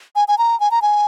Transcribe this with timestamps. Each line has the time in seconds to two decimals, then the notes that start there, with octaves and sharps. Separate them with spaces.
0.16 G#5
0.28 G#5
0.38 A#5
0.60 G#5
0.71 A#5
0.82 G#5